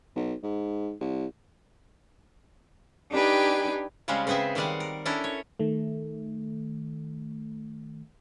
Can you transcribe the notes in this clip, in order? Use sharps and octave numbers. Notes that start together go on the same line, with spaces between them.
B1
G#2
C2
D4 D#4 G4 B4 G5 G#5
C#3 G3 G#3 C4 C#4
C#3 B3 C4 G#4 E5
D#3 G3 G#3 D5 F5 F#5
A#4
C#4 D4 E4 A4 A#4
C#5
D#3 A3